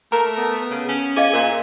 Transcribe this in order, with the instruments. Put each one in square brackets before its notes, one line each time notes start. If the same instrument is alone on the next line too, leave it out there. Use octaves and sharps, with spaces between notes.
[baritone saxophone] A3 [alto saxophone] A#4 [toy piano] A#5
[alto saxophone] B3
[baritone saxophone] C#3
C#4
[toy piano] G#4 D#5 F5 [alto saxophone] G#5
[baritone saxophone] A#2 [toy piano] A#4 E6